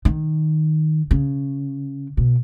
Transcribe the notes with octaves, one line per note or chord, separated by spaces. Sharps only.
D#3
C#3
B2